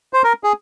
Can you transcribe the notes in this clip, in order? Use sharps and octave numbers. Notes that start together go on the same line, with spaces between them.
C5
A#4
G#4